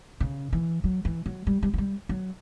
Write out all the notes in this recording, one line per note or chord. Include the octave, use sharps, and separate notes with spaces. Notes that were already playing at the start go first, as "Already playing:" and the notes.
C#3
E3
F#3
E3
F#3
G3
G3
F#3
G3
F#3